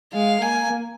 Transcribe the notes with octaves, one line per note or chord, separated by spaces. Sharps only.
G#3 F5
A#3 G#5